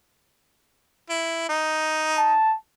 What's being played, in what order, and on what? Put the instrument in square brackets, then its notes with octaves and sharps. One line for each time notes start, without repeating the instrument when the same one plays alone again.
[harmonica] E4
D#4
[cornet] A5